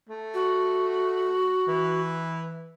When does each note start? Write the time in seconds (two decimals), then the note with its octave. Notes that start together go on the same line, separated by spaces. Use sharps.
0.09 A3
0.34 F#4
1.68 E3